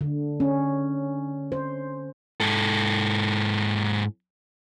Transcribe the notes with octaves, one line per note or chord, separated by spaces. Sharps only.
D3
C#4
C5
G#2 A4